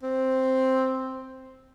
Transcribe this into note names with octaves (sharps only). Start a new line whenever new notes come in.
C4